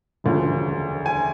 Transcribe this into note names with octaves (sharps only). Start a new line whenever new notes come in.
E1 D2 C#3 F3
G#5